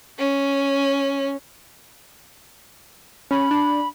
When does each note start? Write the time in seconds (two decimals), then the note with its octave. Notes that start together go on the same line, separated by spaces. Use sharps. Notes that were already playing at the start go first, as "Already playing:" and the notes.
0.19 C#4
3.31 C#4 B5
3.51 D4